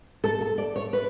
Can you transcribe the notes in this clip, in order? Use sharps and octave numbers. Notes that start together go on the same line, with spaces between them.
A4
A4
D5
C#5
B4